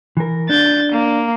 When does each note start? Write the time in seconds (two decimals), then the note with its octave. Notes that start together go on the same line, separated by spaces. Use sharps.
0.17 E3 A#4
0.49 D4 G6 A6
0.92 A#3